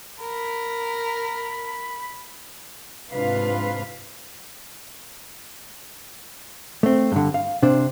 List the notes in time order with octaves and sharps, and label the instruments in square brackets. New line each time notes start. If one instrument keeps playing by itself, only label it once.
[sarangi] A#4 [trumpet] B5
[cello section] G#2 C3 D4 F4 B4 F5
[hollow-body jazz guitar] A3 C4
G2 D3
F5
C3 D4 C5